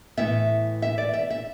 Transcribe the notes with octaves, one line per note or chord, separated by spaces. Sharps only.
A2 E3 B3 E5
E5
D5
E5
E5